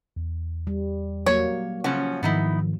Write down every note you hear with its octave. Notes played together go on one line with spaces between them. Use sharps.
E2
G3
F#3 A#3 C#5
C#3 F3 C#4 F#4
G#2 D#3 F3 B3 D#4 E4